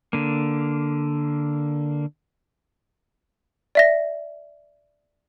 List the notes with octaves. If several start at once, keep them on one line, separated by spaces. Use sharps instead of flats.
D3 A#3
D5 E5 A#6